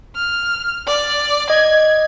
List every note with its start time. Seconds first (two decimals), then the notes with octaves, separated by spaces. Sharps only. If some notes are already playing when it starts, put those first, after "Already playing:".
0.16 F6
0.87 D5
1.50 D#5 G#6